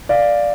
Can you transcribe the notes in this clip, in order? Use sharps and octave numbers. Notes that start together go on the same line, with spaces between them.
D5 F5